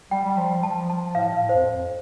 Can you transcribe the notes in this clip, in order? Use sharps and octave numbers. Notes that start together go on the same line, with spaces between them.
G3 G5
G3
F3
F3 A5
F3 A5
A2 F5
F5
A2
F2 C5
F2